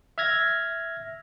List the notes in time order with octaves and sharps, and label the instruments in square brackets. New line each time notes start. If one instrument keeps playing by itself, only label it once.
[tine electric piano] E5 F6 G#6 A#6